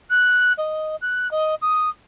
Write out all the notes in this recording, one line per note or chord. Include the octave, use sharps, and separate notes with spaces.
F#6
D#5
F#6
D#5
D#6